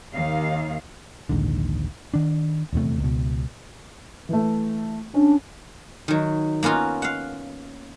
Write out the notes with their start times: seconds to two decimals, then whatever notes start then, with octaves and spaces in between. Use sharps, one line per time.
0.13 D#2 D#3 F5
1.29 A#1 D#2 G#2 D3
2.14 D#3 D4
2.73 D#1 E2 C3 A3
3.00 C#2 B2
4.29 E3 A3
5.14 C#4 D4
6.08 D#3 F#3
6.63 A#3 B3 C#4 F4 F#4
7.02 F5 F#5